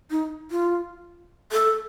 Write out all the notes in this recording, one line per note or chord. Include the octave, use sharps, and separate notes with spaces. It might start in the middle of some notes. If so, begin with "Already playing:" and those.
D#4
F4
A4